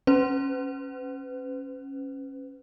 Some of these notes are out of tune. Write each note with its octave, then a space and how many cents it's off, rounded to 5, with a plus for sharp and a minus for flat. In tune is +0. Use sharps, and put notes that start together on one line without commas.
C#4 -15 B4 +35